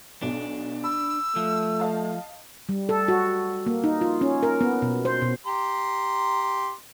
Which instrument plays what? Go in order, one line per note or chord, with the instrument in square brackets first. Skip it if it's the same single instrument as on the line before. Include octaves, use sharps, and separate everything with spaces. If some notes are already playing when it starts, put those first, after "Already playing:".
[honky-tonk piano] B1 B2 [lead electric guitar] D4
[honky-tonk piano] B5 [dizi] E6
[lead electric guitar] F3 [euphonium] A3
[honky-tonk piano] D#5 F5 A5
[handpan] G3
A4
F#4
A#3
D#4
F4
C#4
A#4
B3
B2
C5
B2
[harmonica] G4 A#5 C6